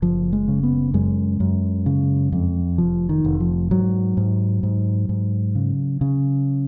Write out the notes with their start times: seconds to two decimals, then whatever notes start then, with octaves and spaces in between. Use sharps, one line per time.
0.02 F#1 F3
0.33 G#3
0.48 C#3
0.63 B3
0.94 F#2 G#3
1.40 F#2
1.86 C#3
2.32 F2
2.78 F1 F3
3.09 D#3
3.24 F1
3.40 F3
3.71 G#2 F#3
4.17 G#2
4.63 G#2
5.09 G#2
5.55 C#3
6.01 C#3